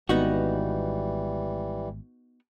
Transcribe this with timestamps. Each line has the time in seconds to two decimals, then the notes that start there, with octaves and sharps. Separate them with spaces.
0.09 G#1 E3 G3 B3 D#4 F#4